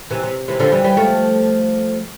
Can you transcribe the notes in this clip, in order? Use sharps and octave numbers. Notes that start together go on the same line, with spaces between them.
C3 E3
C3
C3 E3
D3 F3
E3 G3
E3 G3
F3 A3